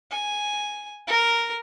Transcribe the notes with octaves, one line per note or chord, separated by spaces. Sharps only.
G#5
A#4